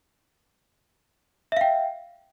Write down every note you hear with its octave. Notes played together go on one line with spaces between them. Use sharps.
E5 F5 G5